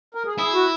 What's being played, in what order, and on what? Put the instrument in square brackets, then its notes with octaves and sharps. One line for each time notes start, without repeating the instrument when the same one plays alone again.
[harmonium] A#4
G#4
[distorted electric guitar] E4 [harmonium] G#4
[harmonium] F#4